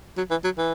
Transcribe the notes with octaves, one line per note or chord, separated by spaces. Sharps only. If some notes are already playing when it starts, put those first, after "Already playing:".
F#3
E3
F#3
E3